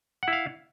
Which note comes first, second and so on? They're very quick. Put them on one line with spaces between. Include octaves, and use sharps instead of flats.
F#5 E4 F5